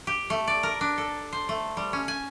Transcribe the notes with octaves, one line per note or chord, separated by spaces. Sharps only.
G4
A3
D5
A#4
D4
A4
C5
A3
G3
C#4
G#5